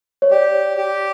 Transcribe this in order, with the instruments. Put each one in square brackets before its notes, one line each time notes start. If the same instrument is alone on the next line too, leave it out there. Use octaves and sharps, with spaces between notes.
[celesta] C#5
[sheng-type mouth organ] G4 [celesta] D5
[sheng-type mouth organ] G4